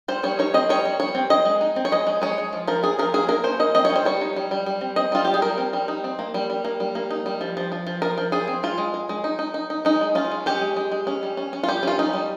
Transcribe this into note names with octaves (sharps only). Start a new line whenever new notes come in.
G3 C5
G3 C#5
D#4 C#5
C4 D#5
G3 C#5
G3
G3 C#5
C4
C4 D#5
G#3
D#4
C4
C#5
G#3 D#5
G#3
G#3 C#5
G#3
F3
F3 A#4
F3 G#4
F3 A#4
A#3 G#4
A#3 A#4
C#4 C5
A#3 D#5
C4 D#5
C#5
G3
C5
G3 C#5
D#4
G3
G3
G3
C4
C4 D#5
G3 F4
G3 G4
G#4
G3 A#4
C4
G3
D#4
C4
A#3
G3
G3
A#3
G3
A#3
D#4
G3
F3
F3
F3
F3
F3 A#4
F3
F3 G#4
C4
G#3 F4
G#3
G#3
G#3
D#4
D#4
D#4
D#4
G#3 D#4
G#3
C#4 F4
G#3
C#4 G4
G#3
G#3
G#3
C#4
G3
C#4
C#4
F4
G3 G4
C#4 F4
C#4 D#4
G3